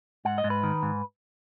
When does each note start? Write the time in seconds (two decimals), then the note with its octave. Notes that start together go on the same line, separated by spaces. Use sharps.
0.25 G#2 F#5
0.38 D#5
0.44 G#2
0.50 B4
0.63 D#3
0.83 G#2